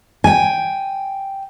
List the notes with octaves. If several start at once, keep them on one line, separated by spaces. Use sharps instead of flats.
G5 G#5